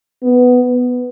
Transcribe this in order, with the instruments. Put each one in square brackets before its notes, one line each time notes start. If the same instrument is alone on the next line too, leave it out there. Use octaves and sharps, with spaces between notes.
[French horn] B3